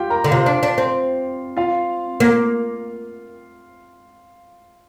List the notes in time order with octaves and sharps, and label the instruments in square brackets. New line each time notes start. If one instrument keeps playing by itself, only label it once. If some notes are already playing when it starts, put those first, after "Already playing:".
Already playing: [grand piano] F4 G4 F5 G5
A#4 A#5
[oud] D3
[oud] C3 [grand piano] F4 F5
[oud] D4
D4
C4
[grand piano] F4 F5
[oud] A#3